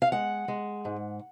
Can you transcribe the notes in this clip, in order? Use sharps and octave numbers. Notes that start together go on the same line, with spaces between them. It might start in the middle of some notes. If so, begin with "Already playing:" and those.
F5
G#3 F#5
G#3
G#2